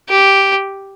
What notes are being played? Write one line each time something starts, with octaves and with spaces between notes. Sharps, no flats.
G4